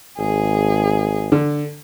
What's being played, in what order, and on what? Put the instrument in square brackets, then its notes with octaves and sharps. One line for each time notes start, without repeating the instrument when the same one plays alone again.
[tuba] G#1 [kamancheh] G#4
[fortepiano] D3